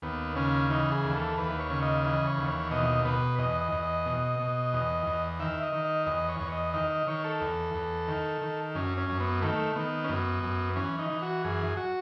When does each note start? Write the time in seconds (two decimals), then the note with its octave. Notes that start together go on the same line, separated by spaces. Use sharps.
0.02 D#2 B3
0.36 C#3 C#4
0.70 E3 D#4
0.92 G#4
1.04 D#2
1.15 A4
1.38 D#2 B4
1.59 C#5
1.70 C#3
1.82 D#5
2.04 E3 D#5
2.27 C#5
2.37 D#2
2.48 C#5
2.71 B2 D#5
3.05 B2 B4
3.38 E2 D#5
3.61 D#5
3.72 E2
3.83 D#5
4.06 B2
4.39 B2
4.73 E2
5.06 E2
5.39 D#3 E5
5.63 D#5
5.73 D#3
5.85 D#5
6.06 E2 D#5
6.29 C#5
6.40 E2
6.52 D#5
6.74 D#3 D#5
6.90 D#5
7.07 D#3 C#5
7.24 A4
7.41 E2
7.74 E2
8.08 D#3
8.41 D#3
8.75 F#2 C#4
8.98 C#4
9.09 F#2
9.20 B3
9.42 D#3 A3
9.75 D#3 B3
10.04 C#4
10.09 F#2 B3
10.43 F#2
10.76 E3 C#4
10.99 D#4
11.10 E3
11.22 F#4
11.44 F#2 G#4
11.77 F#4